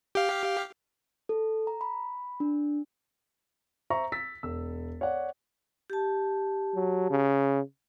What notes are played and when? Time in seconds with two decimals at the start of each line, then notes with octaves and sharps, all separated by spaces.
0.15 G4 F5
1.29 A4
1.67 A#5
1.81 B5
2.40 D4
3.90 C5 E5 A#5 C#6
4.12 E6 A6 B6
4.43 E1 E6
5.01 C#5 D5 F#5
5.90 G4 A5
6.75 F#3
7.10 C#3